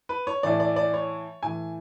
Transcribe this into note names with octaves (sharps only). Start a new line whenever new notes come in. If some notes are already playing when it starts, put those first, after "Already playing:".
B4
C#5
A2 E3 D5
D5
D5
C#5
A2 E3 G#5